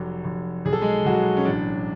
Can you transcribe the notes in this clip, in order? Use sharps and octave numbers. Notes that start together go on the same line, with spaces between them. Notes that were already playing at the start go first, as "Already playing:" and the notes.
Already playing: F1 F#3
F1
B1 G#4
A4
G#3 G#4
B1 F#3 F#4
C#4
A1 D4